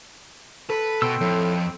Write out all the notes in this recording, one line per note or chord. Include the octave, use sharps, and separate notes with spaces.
A4 B4
B2 G5 C6 E6
F2 A2